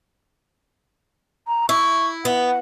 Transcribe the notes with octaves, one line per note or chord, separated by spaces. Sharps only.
A#5
E4 C#6
B3 F#5